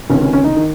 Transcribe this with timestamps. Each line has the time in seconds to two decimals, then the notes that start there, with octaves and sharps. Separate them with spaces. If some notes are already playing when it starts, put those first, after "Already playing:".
0.10 C#2 C3 D#3 C#4
0.21 C#4
0.33 C#4
0.44 D#4
0.56 D#3